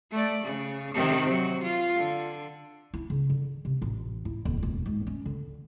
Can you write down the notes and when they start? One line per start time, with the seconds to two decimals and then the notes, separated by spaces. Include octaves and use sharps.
0.12 A3 D5
0.44 C#3
0.94 C3 D#3
1.30 F#3
1.63 F4
1.96 D3
2.94 E4
3.10 C#3
3.30 D3
3.65 C3
3.82 A1
4.25 E4
4.45 D#1
4.63 E1
4.86 G#2
5.07 C#4
5.25 D3